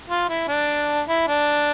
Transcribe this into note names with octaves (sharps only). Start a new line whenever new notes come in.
F4
E4
D4
E4
D4